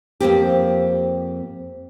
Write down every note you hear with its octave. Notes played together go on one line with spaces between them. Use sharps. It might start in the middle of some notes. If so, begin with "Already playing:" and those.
F2 A#3 C4 G4